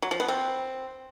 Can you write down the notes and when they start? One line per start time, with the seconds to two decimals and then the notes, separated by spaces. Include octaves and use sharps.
0.02 F#3
0.11 F3
0.20 B3
0.28 C4